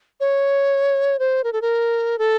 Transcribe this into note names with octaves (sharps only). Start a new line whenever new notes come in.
C#5
C5
A#4
A4
A#4
A4